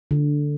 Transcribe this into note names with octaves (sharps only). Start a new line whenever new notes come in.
D3